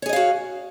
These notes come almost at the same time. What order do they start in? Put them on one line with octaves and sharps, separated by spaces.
C#5 G#4 D#5 F5 F#4